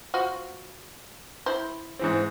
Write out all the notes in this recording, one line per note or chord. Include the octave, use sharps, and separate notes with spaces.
F4 F#4 C5
E4 C5
G#2 E3 C4